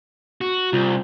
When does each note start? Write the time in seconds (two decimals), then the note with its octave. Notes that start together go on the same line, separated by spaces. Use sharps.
0.41 F#4
0.73 C2 F4